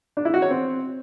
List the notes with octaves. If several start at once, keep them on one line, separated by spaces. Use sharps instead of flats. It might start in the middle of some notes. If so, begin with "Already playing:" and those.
D4
E4
F#4
C#5
C4